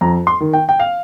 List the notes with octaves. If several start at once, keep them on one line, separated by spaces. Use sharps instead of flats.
F2 A#5
C6
D#3
G5
G5
F5